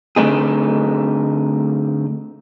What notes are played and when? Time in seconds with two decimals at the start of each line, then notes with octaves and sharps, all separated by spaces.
0.16 D3 A3 C4 D#4 G#4